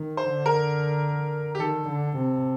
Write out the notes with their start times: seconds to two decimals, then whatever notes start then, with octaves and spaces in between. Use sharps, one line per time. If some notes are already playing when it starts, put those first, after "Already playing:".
Already playing: D#3
0.17 C5
0.31 D3
0.46 A#4
1.55 G4
1.59 D#3 A4
1.89 D3
2.17 C3